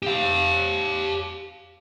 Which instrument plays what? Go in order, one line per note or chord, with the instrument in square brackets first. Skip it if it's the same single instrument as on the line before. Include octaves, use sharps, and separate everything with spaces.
[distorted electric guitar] G4 F5